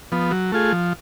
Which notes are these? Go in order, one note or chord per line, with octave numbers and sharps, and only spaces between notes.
F3 B3
F#3
A3 F4 G#4
F3